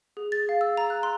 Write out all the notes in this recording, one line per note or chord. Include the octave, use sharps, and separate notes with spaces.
G#4
A6
F5
E6
A#5
F#6
C6